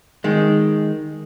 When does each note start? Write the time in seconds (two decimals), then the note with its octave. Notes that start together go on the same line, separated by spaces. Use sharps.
0.24 D#3 G#3